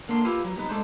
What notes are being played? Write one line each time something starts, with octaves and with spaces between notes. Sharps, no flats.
D3 A#3 D4 C6
E4 F4 G4 B4 F5
F#3
G3 B3 D#4 B4
G#3 A3 D4 C5